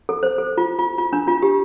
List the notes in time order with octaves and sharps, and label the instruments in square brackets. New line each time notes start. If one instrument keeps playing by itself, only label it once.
[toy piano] A4
C5
A4
F4
F4
F4
D4
F4
G4